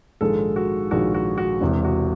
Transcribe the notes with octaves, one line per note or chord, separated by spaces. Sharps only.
A#1 G#2 D#3 G#3 A4
F#4
A#1 G#2 D#3 G#3 F#4
F#4
F#4
E1 E2 C3
F#4